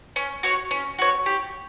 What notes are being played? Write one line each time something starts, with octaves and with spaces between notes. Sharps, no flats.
C#4
F#4 C#5
C#4
F#4 C#5
G4